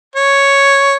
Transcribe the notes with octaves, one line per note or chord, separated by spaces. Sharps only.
C#5